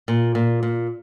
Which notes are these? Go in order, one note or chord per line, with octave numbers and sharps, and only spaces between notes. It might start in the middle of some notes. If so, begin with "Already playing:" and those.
A#2
A#2
A#2